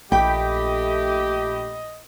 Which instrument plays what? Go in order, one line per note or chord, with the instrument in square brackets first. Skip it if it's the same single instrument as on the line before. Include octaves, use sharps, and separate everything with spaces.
[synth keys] A#1 B5 [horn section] A3 G4 [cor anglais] D#5 [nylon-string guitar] G5